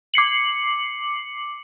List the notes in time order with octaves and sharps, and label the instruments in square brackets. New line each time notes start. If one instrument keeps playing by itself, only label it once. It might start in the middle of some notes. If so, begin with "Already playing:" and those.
[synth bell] D6 C7 C#7 F#7